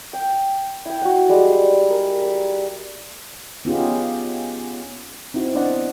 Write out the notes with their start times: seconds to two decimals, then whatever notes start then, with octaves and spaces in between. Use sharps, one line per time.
0.13 G5
0.85 E4 G5
1.01 F#4 F#5
1.29 G3 G#3 G#4
1.90 A#4
2.22 B5 D6
3.65 B3 C#4 D#4 F4 G4 G#4
5.34 C4 D#4 E4 F#4
5.55 B3 D4 C5 D5 D#5 F#5